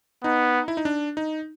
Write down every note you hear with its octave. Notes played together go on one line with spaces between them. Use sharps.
B3 D#4
E4
D#4
D4
D#4